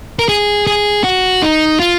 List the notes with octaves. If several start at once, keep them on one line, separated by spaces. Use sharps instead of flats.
A#4
G#4
G#4
F#4
D#4
F4